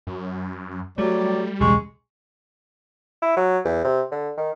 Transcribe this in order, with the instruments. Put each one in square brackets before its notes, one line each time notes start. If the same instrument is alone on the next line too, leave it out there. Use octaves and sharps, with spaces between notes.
[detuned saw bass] F#2
[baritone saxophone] F#3 [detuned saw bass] G3 [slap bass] A3 [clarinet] D5
[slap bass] B1 E2 C#3 [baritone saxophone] G#3 [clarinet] C#6
[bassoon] E4
F#3
E2
C3
D3
D#3